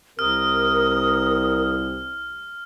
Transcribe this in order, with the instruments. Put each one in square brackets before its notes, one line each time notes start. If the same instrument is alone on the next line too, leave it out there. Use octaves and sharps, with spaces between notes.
[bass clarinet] C2 [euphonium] C3 [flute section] A#4 D#6 [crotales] F6